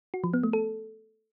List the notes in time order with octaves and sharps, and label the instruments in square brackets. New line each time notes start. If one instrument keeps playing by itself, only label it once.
[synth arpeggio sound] F#4
F3
B3
A3
A4